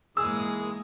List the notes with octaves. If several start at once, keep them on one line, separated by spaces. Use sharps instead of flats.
G#2 E3 G#3 A#3 G#4 D#6 E6